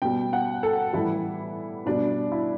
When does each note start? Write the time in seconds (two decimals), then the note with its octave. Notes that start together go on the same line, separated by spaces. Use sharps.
0.02 B2 G3 G5
0.33 F#5
0.63 A4
0.93 A2 E3 G3 E4
1.86 B2 G3 D4
2.32 E4